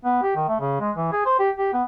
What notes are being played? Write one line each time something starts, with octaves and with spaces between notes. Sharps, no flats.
B3
G4
D#3
A3
C#3
G#3
E3
G#4
C5
G4
G4
B3